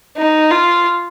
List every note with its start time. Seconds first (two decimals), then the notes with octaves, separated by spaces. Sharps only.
0.17 D#4
0.51 F4